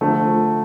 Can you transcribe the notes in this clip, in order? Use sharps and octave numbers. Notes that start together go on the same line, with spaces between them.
D3 F3 A3